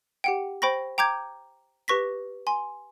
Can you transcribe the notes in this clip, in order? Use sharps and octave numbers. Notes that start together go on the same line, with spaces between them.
G4 F#5 G5
C5 G5 B5 C#6 A#6
G5 A#5 D6 G6 G#6
G4 B4 C#6 A#6 B6
G#5 C6